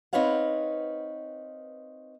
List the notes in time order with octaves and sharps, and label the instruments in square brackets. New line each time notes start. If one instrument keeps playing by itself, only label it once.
[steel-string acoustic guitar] C4 D#4 B4 C#5 F5 F#5